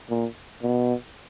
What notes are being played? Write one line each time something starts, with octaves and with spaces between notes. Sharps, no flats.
A#2
B2